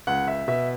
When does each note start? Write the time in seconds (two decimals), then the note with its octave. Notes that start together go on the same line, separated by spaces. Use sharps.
0.07 C#2 F#5
0.28 E5
0.48 B2 E5